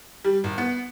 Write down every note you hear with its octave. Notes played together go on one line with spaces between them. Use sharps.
G3
G#1
B3